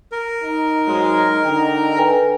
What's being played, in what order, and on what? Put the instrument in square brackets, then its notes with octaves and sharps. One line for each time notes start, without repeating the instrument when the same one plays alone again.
[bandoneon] A#4
[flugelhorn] D#4
[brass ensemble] G#2 F#3 G#3
D3 G5 A#5
[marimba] A4 B4 G#5